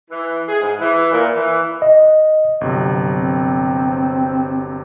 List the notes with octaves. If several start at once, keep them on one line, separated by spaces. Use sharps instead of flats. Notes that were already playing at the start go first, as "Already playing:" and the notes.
E3
G#4
G#2
E3
A#2
E3
D#5
G1 C3 F#3
C4